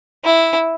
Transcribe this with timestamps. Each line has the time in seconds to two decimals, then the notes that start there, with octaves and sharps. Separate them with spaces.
0.25 E4